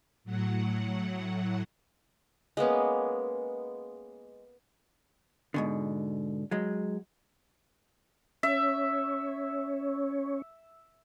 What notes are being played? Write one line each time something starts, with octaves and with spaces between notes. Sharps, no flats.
A2 F#3 F#5
G#3 A#3 B3 C#4
G#2 B2 D3
F#3 G#3
C#4 C#5 E5